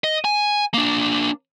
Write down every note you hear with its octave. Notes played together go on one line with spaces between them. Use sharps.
D#5
G#5
A#3 D4